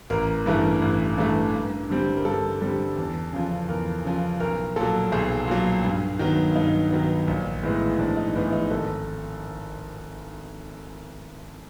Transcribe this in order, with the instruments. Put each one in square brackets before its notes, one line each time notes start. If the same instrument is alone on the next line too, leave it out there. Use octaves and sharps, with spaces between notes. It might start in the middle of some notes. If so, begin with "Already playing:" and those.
[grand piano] A1 A#4
G2 E3 A3
A1
G2 E3 A3
G2
D3 G3 C4
A#4
G2 A4
D3 G3 C4
E2
C#3 F3
E2 A#4
C#3 F3
B1 A#4
A#2 F#3 A4
B1 G#4
A#2 F#3
G2
D#3 F#3 B3
G2 D#4
D#3 F#3 B3
A#1
A2 E3 G#3 B3
A#1 D4
D#4
A2 E3 G#3 B3
D#4
G#1 A4